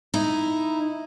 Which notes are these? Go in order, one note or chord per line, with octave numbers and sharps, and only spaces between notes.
D#4 E4